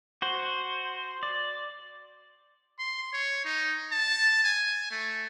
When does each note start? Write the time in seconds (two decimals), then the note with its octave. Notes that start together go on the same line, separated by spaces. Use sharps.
0.22 F#4 C5
1.23 D5
2.79 C6
3.13 C#5
3.45 D#4
3.92 A5
4.44 G#5
4.91 A3